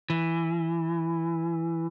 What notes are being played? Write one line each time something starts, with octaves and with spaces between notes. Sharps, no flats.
E3